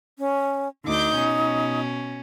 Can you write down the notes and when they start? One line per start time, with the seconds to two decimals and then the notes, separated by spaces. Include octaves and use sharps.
0.19 C#4
0.85 D2 D#4 D6 G6
1.15 B2 C#4